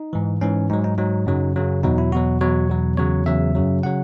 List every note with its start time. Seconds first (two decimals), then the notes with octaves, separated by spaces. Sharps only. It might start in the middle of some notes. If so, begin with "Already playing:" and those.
Already playing: D#4
0.13 G#2 E3
0.41 G#2 E3 C#4
0.70 G#2 F#3 D#4
0.84 D#4
0.98 G#2 F#3 D#4
1.26 F#2 C#3 F#3
1.56 F#2 C#3 F#3
1.83 E2 B2 F#3 D#4
1.98 E4
2.12 E2 B2 F#3 F#4
2.41 E2 B2 F#3 C#5
2.69 E2 B2 F#3
2.97 E2 C#3 F#3 C#5
3.26 E2 C#3 F#3 E5
3.55 F#2 C#3 F#3
3.83 C#3 F#3 F#5